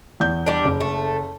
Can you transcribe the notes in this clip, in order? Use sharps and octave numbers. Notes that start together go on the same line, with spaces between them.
E2 G6
G3 D4
F#1
A3